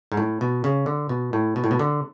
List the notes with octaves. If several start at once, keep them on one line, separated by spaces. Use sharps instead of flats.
G#2
A2
B2
C#3
D3
B2
A2
B2
A2
B2
D3